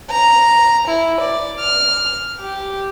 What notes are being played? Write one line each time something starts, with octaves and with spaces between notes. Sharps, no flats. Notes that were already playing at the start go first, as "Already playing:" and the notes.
A#5
E4
D5
F6
G4